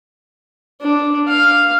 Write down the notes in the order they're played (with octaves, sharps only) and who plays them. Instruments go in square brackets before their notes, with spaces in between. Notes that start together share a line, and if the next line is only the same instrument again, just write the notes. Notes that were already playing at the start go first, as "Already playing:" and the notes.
[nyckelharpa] D4
F5